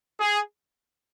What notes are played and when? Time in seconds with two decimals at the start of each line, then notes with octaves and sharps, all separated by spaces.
0.20 G#4